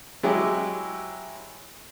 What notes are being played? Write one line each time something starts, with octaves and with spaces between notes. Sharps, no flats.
F#3 G#3 E4 G4